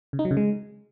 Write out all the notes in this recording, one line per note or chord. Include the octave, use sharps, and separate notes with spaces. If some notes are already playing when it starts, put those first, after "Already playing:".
C#3
D#4
F#3
C#3
G#3